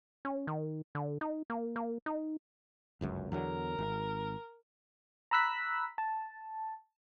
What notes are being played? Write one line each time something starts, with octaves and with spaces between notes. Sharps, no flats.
C#4
D#3
D3
D#4
A#3
A#3
D#4
G1 C#2 F#2
E2 D3 F#3 A#4
G#1
A#5 B5 E6 F#6 B6
A5